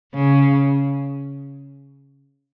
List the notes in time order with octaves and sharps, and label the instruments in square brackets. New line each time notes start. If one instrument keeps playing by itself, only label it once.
[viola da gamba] C#3